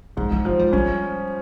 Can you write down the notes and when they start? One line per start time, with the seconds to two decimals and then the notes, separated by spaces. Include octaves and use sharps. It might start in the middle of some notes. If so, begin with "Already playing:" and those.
0.17 G#2 F3
0.32 F3
0.45 F3 G#3
0.59 G3
0.73 G3 C#4